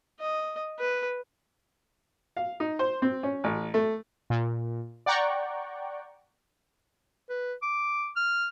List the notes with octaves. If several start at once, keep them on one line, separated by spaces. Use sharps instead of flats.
D#5
B4
F5
D#4
C5
C4
C#4
A1
A3
A#2
D5 F#5 G5 A#5 C#6
B4
D6
F6